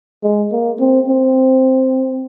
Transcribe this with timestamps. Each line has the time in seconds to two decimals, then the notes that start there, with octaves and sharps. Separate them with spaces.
0.23 G#3
0.52 A#3
0.80 C4
1.08 C4